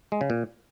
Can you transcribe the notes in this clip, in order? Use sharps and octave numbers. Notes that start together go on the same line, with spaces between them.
G#3
C#3
A#2